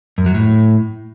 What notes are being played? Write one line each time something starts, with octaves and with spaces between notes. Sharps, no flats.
F#2
F#3
A2